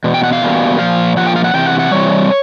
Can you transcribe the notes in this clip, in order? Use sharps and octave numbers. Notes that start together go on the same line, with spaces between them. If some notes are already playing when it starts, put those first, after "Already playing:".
E2 B2
G5
F#5
F5
E2 B2 G3 A#3
A#2 F3 F5
A#2 F3 F#5
G5
F5
F#5
C3 E3 G5
F#5
F#5
C3 E3 G3 C#5